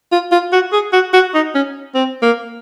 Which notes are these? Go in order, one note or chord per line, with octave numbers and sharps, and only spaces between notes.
F4
F4
F#4
G#4
F#4
F#4
D#4
C#4
C4
A#3